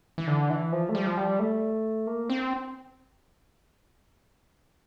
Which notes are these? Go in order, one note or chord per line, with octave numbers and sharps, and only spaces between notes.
E3
D3
E3
F3
A3
G3
F3
G3
A3
A#3
C4